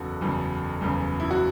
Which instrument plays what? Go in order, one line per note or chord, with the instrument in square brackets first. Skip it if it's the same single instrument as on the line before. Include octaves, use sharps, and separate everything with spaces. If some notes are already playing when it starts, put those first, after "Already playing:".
Already playing: [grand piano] F#1 E2 C#3 F#4 A4
F#1 E2 C#3
F#1 E2 C#3
E4
F#4